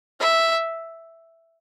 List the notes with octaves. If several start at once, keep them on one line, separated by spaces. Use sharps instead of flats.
E5